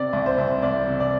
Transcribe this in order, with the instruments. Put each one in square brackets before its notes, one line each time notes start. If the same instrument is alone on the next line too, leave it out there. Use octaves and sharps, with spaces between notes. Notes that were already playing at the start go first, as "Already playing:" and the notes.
Already playing: [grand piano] C3 D5
C2
C5
C2
C2 D5
C3
D5